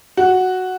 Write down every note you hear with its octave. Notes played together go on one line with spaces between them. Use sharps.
F#4